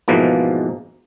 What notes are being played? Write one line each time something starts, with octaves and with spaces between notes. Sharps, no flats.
G#2 B2 E3 F3 A#3